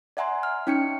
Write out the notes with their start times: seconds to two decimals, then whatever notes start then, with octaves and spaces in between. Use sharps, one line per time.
0.17 D5 E5 F#5 G#5 A#5 C6
0.43 F6
0.67 C#4 D#4 G5 C#6 C#7